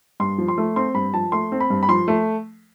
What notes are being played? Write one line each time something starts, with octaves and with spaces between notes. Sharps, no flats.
G2 C6
F3
C6
A3
C4 C6
G2 B5
F3 A5
A3 C6
C4
B5
G2
B5
F3 C6
A3